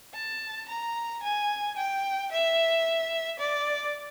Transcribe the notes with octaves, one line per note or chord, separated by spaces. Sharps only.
A5
A#5
G#5
G5
E5
D5